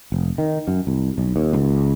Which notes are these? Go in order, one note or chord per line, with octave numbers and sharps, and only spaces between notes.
F1
D#3
F#2
C2
B1
D#2
C#2